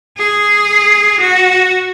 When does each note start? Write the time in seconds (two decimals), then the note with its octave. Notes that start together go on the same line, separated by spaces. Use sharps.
0.18 G#4
1.21 F#4